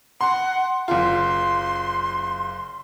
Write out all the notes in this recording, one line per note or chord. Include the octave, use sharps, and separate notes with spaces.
F#5 C6
F#1 F4 C6